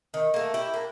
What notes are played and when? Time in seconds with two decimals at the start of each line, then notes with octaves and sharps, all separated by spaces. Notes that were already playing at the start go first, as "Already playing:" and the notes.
0.14 D#3
0.34 A3 A#3
0.54 E4 G4
0.74 A#3 D4